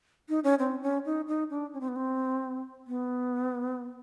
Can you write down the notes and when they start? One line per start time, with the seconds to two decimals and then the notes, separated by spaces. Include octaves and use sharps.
0.29 D#4
0.44 C#4
0.59 C4
0.82 C#4
1.05 D#4
1.28 D#4
1.50 D4
1.74 C#4
1.81 C4
1.88 B3
1.96 C4
2.87 B3